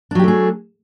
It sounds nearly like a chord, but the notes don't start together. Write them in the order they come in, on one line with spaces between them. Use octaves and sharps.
D4 F#3 G4 A3 G#4